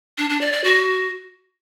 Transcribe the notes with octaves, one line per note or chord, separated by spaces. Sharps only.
D4
D4
D5
D5
F#4